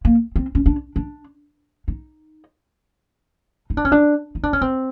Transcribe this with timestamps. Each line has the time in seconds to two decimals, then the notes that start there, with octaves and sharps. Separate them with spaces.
0.05 A#3
0.36 C4
0.55 C#4
0.66 D4
0.96 D4
1.88 D#4
3.70 D#4
3.77 D4
3.85 C#4
3.92 D4
4.35 D#4
4.43 D4
4.53 C#4
4.61 C4